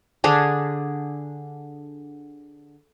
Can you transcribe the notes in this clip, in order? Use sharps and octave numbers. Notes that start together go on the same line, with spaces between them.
D3 D4 G#4